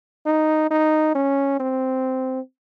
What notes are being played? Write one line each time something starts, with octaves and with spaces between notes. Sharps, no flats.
D#4
D#4
C#4
C4